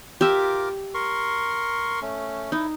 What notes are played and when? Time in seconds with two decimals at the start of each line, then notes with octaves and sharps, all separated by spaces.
0.21 F4 G4 A#4 E5 D6
0.94 A#4 C6 C#6
2.01 A3 C#4
2.52 D#4 E4